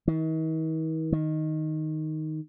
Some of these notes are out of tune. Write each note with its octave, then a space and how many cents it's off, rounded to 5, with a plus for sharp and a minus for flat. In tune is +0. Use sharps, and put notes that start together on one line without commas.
D#3 +45
D#3 +0